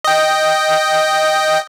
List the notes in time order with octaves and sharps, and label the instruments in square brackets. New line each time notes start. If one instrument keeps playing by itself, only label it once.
[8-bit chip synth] D#5 G5